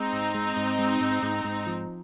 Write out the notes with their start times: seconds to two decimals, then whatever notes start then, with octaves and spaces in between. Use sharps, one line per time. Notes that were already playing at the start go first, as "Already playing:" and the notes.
Already playing: G#3 C4 D#4
0.13 G#2
0.34 G#3
0.56 G#2
0.79 G#3
1.01 G#2
1.22 G#2
1.44 G#2
1.67 F3